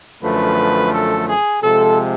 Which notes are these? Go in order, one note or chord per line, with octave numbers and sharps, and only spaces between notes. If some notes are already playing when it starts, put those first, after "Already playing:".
F#2 D3 F3 A3 B4
A4
G#4
C3 F3 G#3 A4